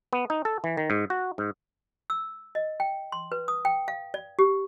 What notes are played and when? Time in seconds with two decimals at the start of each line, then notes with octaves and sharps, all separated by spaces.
0.13 B3
0.30 D#4
0.45 A4
0.64 E3
0.77 D#3
0.90 G#2
1.10 F#4
1.38 G#2
2.10 E6
2.55 D#5
2.80 G5
3.12 C6
3.32 B4
3.48 D#6
3.65 G5
3.88 F5
4.14 D5
4.39 G4